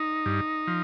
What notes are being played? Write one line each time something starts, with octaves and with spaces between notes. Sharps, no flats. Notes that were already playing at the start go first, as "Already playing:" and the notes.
Already playing: D#4
G2
F3